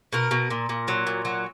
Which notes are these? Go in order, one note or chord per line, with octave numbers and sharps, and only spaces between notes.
B2 A#4
B2
A#2
A#2
F#3
A#2
F#3